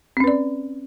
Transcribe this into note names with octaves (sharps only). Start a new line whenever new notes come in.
C4 C#4 B4 D5